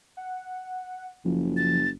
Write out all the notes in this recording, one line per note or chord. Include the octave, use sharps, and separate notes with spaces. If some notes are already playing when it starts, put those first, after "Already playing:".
F#5
F#1 F3
A6